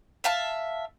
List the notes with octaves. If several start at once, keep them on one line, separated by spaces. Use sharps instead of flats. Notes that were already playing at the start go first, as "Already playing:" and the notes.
E5 F5 A5